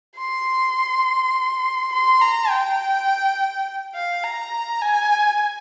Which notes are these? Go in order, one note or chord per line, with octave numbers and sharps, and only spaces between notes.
C6
C6
A#5
G5
F5
A#5
G#5